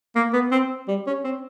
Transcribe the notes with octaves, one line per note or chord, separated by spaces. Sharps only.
A#3
B3
C4
G3
C#4
C4